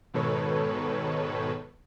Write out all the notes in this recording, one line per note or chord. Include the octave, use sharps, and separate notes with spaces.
G#2 B2 D#3 A4 B4 C#5